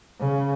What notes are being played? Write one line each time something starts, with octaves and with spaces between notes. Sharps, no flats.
C#3